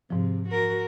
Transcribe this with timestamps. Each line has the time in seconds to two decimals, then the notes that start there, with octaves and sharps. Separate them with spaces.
0.10 G#2 C3 F3
0.48 F#4 A#4